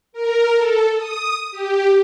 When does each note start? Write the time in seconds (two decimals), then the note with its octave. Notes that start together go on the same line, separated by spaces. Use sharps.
0.13 A#4
0.55 A4
0.96 D#6
1.51 G4